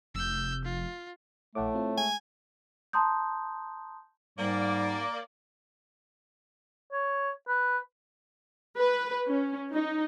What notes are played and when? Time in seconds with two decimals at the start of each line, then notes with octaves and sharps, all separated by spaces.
0.15 F1 E6 G6
0.64 F4
1.55 A#1 A2 A3 F#5 D6
1.74 C4 F4
1.98 G#3 G#5
2.93 A5 A#5 C6 D#6 G6
4.38 G#2 G3 A#3 D5
6.92 C#5
7.48 B4
8.79 B4
9.28 C#4
9.73 D#4